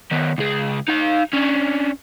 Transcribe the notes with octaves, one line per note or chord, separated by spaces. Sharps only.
D#3 B3
C#2 G#4
D#4 F5
C#4 D4